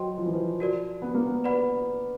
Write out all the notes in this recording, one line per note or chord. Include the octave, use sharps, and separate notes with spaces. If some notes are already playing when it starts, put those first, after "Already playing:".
Already playing: F#3 C5 D#5 G5 C6
F3
E3
F3
F#4 A#4 D5
B3
A#3
B3
B4 D5 F#5 B5